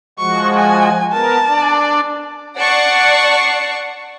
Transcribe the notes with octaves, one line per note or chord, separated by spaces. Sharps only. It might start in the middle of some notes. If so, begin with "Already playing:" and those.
F3 G#3 F#4 C#6
G#5
B3 A#4 A5
D4 D5
D5 F#5 A5 C#6 C7